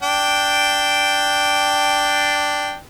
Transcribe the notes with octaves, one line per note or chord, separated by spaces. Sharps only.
D4 G5